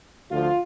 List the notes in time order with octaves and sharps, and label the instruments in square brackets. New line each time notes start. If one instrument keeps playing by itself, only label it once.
[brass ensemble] D2 D3 F3 F4